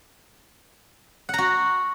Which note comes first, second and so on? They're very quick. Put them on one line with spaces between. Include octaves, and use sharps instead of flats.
F#5 A#5 F#4